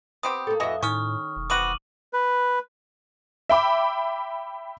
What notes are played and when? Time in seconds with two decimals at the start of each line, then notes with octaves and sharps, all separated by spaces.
0.23 B3 C4 G4 D#6
0.47 A#3 A4
0.60 F2 E3 F#4 D#5 E5
0.83 A2 D#3 C#4 C#6 D#6 F6
1.36 E1
1.50 B3 C4 F#4 D6 D#7 F#7
2.13 B4
3.49 E5 G5 B5 D6